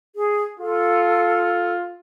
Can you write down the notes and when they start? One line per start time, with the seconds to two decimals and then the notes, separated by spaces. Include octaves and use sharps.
0.16 G#4
0.59 F4 A4